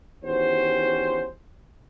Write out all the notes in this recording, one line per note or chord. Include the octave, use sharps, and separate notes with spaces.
E2 D#3 C#4 F#4 G4 C5